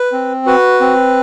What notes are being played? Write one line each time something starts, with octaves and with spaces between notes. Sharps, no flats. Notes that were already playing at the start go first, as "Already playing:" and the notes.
Already playing: B4
C4
F#4 B4
C4